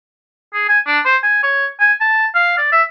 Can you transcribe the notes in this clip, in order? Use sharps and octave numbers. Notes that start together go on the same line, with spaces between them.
G#4
G#5
D4
C5
G#5
C#5
G#5
A5
F5
D5
E5